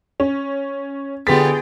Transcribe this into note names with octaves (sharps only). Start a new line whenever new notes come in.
C#4
D3 B3 F4 G4 G#4 G5 A6 B6